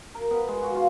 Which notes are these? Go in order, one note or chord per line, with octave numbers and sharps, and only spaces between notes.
A#4
B3
G#3
F#4
F4